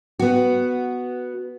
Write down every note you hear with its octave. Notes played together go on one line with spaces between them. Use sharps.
B3 F#4